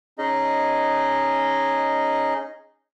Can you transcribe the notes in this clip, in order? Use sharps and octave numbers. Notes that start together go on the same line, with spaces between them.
C#4 D#4 G#4 D#5